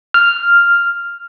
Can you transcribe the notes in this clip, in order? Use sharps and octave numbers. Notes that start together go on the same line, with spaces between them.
F6